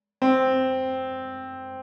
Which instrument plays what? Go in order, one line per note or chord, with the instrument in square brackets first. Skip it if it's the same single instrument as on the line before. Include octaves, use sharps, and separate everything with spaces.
[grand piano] C4